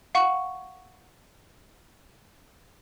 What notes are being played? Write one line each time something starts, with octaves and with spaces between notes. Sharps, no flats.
F5 F#5 C#6